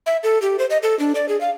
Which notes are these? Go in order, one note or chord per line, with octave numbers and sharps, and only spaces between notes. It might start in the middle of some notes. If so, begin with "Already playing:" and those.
E5
A4
G4
C5
D#5
A4
D4
D5
G#4
F5